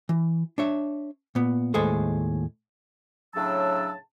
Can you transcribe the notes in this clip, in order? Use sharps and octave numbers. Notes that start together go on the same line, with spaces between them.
E3
D4 C#5 E5
A#2 B3
D#2 A2 G#3 G#4 A4 C5
A2 C#3 F#3 D4 A5 E6